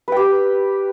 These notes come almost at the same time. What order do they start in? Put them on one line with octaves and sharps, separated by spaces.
B4 G5 G4